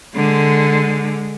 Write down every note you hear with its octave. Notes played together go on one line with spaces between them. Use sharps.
D3 G#3